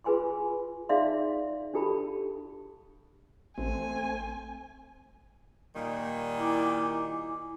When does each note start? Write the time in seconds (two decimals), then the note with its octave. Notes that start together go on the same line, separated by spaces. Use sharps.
0.04 F4 G#4 B4 G#5 C6 C#6
0.89 D#4 G#4 D5 E5 F5 C6
1.74 D4 F#4 G4 A4 A5 B5
3.58 A1 A3 C4 G#5
5.75 A#2 D#3 G3
6.38 E4 G#5 D6